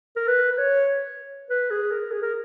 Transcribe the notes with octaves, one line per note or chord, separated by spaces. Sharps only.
A#4
B4
B4
C#5
B4
G#4
A#4
G#4
A#4